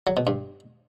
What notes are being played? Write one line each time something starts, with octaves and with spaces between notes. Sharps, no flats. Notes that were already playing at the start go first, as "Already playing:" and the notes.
F#3
B2
G2